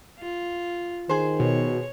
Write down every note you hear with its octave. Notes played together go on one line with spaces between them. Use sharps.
F4
D#3 G#4 C5
B2 C#5